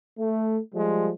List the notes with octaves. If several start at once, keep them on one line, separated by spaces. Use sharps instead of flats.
A3
F3 G3 G#3